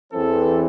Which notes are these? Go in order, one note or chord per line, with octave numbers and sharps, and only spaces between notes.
E2 E3 C4 A4